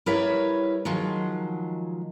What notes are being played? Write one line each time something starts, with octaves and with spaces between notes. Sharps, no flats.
G3 E4 A#4 B4 C#5 E5
D#3 F3 F#3 G#3